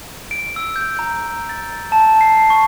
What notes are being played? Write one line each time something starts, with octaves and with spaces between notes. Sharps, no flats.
D7
E6
G6
A#5
A6
A5
C7
C#6